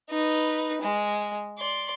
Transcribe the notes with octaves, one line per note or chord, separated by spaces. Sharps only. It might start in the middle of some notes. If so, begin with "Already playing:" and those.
D#4 B4
G#3
D5 C6